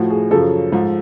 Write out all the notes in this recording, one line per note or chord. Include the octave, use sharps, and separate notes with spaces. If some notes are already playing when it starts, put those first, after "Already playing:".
Already playing: A2 F3 F#4
G#4
F#2 C#3 F3 A4
G#2 F3